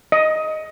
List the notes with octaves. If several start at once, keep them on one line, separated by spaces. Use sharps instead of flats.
D#5